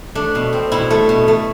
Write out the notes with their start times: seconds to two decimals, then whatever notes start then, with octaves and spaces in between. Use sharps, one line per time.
0.15 A3 D4
0.35 B2
0.53 C4
0.72 B2 E4
0.90 A3
1.09 B2
1.28 A3